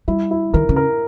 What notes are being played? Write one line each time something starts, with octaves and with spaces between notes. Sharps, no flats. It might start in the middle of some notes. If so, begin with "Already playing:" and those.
G3 E4
E4
D#3 A#4
C#3
A#4